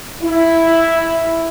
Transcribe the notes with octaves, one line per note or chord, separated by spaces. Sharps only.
E4